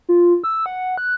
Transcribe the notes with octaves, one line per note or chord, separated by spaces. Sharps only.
F4
E6
F#5
F#6